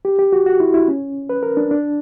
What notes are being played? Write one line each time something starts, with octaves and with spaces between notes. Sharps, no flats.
G4
G4
F#4
F#4
E4
E4
C#4
B4
A#4
D4
D4